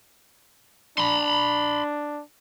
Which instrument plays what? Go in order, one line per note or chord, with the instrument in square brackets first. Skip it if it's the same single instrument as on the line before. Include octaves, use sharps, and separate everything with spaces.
[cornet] D4 [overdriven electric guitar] B5 C6